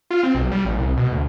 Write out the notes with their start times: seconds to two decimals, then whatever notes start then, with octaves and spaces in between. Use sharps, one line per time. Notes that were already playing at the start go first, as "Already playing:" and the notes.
0.11 F4
0.23 C4
0.35 B1
0.52 G3
0.65 A1
0.78 C2
0.97 B2
1.12 D2